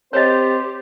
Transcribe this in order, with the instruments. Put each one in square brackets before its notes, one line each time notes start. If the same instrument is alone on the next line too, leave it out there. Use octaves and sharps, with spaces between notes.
[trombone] C4 [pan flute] G4 [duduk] C5 [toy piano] C#5 D#5